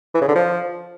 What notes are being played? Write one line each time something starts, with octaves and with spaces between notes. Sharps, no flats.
E3
C#3
D3
F3